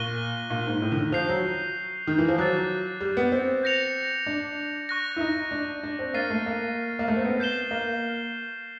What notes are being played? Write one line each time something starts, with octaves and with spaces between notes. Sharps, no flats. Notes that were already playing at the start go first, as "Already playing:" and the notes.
Already playing: A#2 C#6 F#6 A#6 D#7 G7
A#2
G#2
A2
D3
D#3
F3 G6 C7 F7
F#3
D#3
E3
F3
F#3 D6 F#6 A6
G3
B3
C4
G6 A#6 C#7 F7
D4
C#6 F#6 A#6
E4
D#4
D4
D4
C4
A#3 F6 A6 C7 D#7
A3
A#3
A#3
A3
C4
B3
G6 C7 E7 G7
A#3